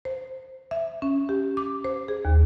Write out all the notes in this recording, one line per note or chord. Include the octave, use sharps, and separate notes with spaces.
C5
E5
C#4
G4
D6
C5
G#4
D#2